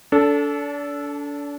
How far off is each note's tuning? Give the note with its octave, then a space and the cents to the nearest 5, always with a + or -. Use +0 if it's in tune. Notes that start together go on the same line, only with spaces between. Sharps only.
D4 -35 A4 +0